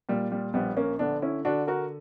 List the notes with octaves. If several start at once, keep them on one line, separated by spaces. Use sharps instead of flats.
A#2 G3
G3
A#1 G3 B3
A#3 C#4
D3 B3 D4
C#4 E4
D3 D4 F#4
F#4 A#4